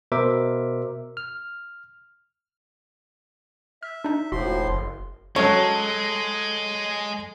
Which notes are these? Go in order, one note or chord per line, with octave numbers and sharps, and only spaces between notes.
B2 A#4 C5 E5 D6
F6
E5 F6
D4 D#4
E1 A2 F3 F#4 C6
F#1
F#3 G#3 C#4 A4 C#5